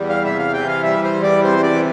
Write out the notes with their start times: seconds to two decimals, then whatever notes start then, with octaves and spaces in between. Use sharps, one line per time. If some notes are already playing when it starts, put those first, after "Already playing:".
Already playing: E2 G3
0.09 F5
0.24 C3 E5
0.39 F5
0.53 E3 G5
0.68 F5
0.83 G3 E5
1.04 C5
1.14 E2
1.23 D5
1.43 C3 C5
1.63 D5
1.73 E3